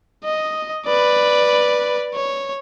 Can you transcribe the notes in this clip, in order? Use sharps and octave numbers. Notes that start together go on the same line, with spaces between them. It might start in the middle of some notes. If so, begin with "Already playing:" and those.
D#5
B4 D5
C#5